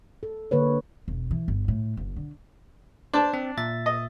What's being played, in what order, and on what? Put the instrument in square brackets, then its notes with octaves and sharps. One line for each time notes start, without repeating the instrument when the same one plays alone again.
[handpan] A4
D3 A#3 B4 C#5
[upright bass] E1
E3
G1
A2
F#1
D3
[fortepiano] D4 A5 [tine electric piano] C5
[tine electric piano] C4
A#2 E5 A6
[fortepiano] D#5